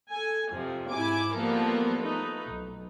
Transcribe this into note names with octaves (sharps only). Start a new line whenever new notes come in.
A4 G#5
F2 C3 F3
G#2 E4 G#5 D6
F3 G3 A#3 B3 A4 A#4
A3 D#4 B4
B1